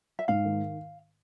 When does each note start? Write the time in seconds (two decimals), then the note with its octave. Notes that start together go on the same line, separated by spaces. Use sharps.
0.19 E5
0.28 G#2 F5
0.45 D#3